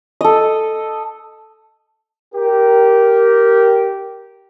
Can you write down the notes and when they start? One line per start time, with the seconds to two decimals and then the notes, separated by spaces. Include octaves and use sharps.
0.21 A4 D#5
2.35 G4 A#4